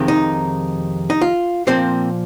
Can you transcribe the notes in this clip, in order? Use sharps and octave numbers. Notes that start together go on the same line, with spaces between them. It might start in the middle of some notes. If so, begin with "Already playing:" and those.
Already playing: F2 C3 D#3 G#3
D#4
D#4
F4
A#2 F3 A#3 C4 C5